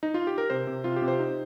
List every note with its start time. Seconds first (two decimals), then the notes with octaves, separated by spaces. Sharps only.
0.03 D#4
0.14 F4
0.27 G4
0.38 A#4
0.50 C3 C5
0.67 C3
0.84 C3 F4
0.96 G4
1.02 C3
1.08 C5
1.19 D#4